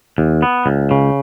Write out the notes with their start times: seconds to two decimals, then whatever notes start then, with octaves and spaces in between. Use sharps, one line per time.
0.18 D#2
0.42 B3
0.66 C#2
0.91 C#3